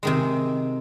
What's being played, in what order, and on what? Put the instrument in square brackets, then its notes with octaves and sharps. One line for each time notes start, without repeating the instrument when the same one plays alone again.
[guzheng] C3 D#3 G#3